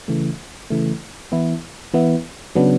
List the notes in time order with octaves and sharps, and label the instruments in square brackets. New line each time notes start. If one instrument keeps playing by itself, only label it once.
[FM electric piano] C#3 E3 A3
C#3 E3 A3
E3 B3 E4
E3 B3 E4
C#3 F#3 B3 D4